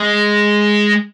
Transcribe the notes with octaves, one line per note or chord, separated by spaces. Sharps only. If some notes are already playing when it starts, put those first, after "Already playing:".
Already playing: G#3